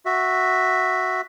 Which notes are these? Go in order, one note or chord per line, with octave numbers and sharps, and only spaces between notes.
F#4 E5